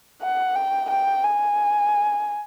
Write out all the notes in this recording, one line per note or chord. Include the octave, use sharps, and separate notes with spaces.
F#5
G5
G5
G#5